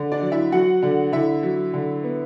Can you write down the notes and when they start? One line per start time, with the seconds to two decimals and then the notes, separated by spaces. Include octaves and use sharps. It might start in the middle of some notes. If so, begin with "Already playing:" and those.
Already playing: D3
0.12 D4 D5
0.22 F#3
0.32 E4 E5
0.52 F#3 F#4 F#5
0.83 D3
1.12 D3 E4 E5
1.43 F#3
1.74 D3
2.04 B3